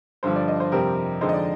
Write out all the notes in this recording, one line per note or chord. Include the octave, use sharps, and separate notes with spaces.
G2 D3 F3 C5
D5
D#5
C5
F2 C3 G3 C4 A#4
F2 D3 G#3 D#4 C5
D#5
D5